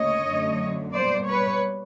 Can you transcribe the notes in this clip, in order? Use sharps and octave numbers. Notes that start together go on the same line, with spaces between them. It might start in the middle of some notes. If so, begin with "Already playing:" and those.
Already playing: D2 C#3 A#3 C#5 D#5
F#2 D3 F#3 A3
B2 G3 A#3 C5 D5
B4 C#5